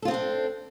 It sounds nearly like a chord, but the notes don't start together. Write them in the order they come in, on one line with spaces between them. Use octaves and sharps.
A4 F4 C4 D#4 D4